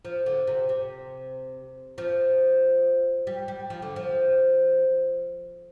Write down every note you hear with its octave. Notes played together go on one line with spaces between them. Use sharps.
F3
D3
C3
C3
F3
G3
G3
F3
D3
F3